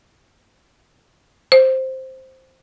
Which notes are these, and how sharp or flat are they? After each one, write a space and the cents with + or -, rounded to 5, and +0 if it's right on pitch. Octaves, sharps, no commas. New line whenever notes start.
C5 +5